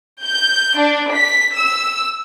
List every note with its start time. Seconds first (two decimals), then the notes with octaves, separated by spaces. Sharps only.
0.24 G6
0.78 D4
1.13 B6
1.57 E6